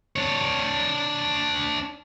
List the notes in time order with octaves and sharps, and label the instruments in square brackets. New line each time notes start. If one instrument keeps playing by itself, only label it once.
[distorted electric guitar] D4 C#5